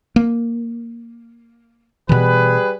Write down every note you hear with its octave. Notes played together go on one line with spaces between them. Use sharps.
A#3
B2 E3 G3 G#4 B4